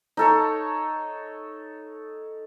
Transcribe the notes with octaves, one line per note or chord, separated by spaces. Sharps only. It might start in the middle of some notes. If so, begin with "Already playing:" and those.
D#4 A4 C#5